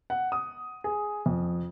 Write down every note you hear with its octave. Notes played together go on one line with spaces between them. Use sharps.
F#5
D#6
G#4
F2